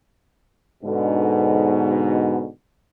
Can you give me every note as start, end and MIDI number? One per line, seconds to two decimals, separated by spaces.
0.84 2.46 44
0.84 2.46 47
0.84 2.46 50